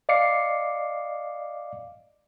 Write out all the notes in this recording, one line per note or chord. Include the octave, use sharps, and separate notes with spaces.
D5 D#5 F5 D6 C7 C#7